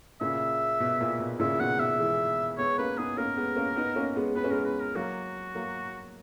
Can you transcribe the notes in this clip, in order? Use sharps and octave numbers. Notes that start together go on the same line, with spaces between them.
A#2 C#3 E5
B2
A#2
B2
A#2 C#3 E5
B2 D#3 F#5
B2 E5
E3 G#3
G#3 B3 C#5
A#3 C#4 B4
B3 D#4 G#4
A#3 C#4 A#4
G#3 B3
A#3 C#4
B3 D#4
A#3 C#4
G#3 B3
B3 B4
C#4
G#3 B3 A#4
B4
A#4
F#3 A#3 F#4
F#3 A#3